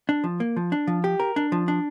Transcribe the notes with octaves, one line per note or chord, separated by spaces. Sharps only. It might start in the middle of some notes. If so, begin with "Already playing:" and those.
D4
F3
A#3
F3
D4
F3
G4
A#4
D4
F3
D4